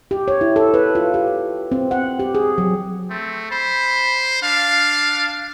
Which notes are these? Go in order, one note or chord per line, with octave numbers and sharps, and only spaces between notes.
G4
C#5
E4
A4
B4
F4
G4
C4
F#5
G4
G#4
F#3
A3 C4
C5 B5
D4 F5